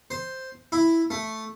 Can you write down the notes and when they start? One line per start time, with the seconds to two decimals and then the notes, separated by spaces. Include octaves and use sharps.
0.11 C5
0.72 E4
1.11 A3